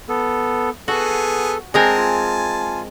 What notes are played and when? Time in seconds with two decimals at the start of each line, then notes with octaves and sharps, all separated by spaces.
0.09 B3 A4
0.88 B3 F#4 G#4 A4
1.74 G#3 C4 A#4 G#5 A5
1.98 F4